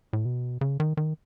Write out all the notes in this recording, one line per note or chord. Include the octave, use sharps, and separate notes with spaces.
A2
B2
C#3
D#3
D#3